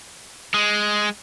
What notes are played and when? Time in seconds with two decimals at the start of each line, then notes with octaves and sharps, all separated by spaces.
0.54 G#3